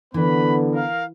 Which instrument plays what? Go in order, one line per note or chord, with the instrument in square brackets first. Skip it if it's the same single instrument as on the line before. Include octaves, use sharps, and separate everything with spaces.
[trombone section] D3 B3 [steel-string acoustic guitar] E3 [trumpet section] B4 B5
[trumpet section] A#4 F5